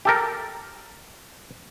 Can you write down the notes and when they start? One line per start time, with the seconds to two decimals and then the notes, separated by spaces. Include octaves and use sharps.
0.05 G4 A4 A#4